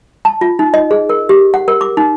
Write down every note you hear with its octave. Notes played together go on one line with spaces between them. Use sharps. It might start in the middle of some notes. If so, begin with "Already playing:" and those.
A5
F4
D#4
D#5
G#4
A#4
G4
F#5
A#4
D6
D#4